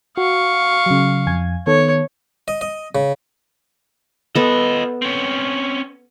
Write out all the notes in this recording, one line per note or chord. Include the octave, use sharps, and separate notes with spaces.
F#4 F5 C#6
C#3 F#3
F2 G#5 G#6
D#3 B3 A4 C#5
D#5
D#5
C#3
B3 F4 A4 D#5
C4 C#4